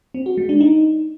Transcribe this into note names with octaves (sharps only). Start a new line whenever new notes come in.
C4
F#4
G#3
D4
D#4